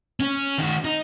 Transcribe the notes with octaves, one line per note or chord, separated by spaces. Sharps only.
C#4
D#3 F#4
D#4